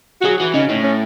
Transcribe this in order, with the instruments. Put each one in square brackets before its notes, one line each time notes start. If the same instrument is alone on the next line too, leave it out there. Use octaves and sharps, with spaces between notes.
[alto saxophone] F#4
[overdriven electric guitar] F#3 [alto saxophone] G#4
[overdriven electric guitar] E3 [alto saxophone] F#4
[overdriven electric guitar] C#3 [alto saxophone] D#4
[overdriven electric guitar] A2 [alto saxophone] C#4
[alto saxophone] C#4